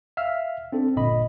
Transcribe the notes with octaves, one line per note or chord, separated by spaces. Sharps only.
E5 F5 E6 F6
C4 D4 A4
G1 A#2 D#5 B5